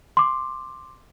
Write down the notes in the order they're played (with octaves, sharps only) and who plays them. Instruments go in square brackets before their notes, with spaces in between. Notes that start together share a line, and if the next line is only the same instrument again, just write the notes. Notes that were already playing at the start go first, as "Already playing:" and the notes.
[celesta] C6 D6